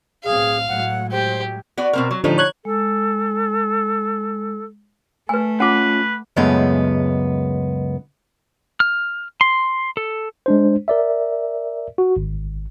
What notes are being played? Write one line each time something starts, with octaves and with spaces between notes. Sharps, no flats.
B1 A2 C4 G#4 F5
A2 F#3 G#3 F#5
G4 C5
B3 F#4 D5
B2 C4 A#4
F#3
A2 D3 F3 G3 D#4
C#5 F#6 G#6
G#3 A4
A3 B4 G#5
C#4 F4 B4 F#5 D6
C#2 F#2 G#3 A3 B3 C#4
F6
C6
A4
G#3 D4 C5
A#4 D5 E5
F#4
G#1